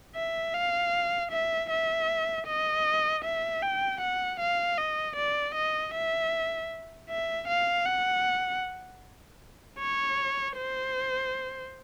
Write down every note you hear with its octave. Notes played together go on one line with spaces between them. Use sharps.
E5
F5
E5
E5
D#5
E5
G5
F#5
F5
D#5
D5
D#5
E5
E5
F5
F#5
C#5
C5